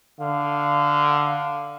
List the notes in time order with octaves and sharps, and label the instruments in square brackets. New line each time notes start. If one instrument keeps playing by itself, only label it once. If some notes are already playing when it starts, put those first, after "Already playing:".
[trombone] D3 [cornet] F5